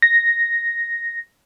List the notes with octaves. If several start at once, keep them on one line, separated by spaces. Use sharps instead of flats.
A#6